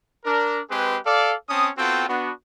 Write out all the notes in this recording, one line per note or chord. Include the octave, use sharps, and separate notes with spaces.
D4 A#4
G#3 C4 G4 G#4 B4
A4 D5 F5
C4 C#4 A5 D#6
B3 C4 F4 F#4 A4 G5
B3 D4 F#4